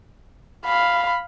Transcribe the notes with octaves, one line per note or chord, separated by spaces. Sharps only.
F5 B5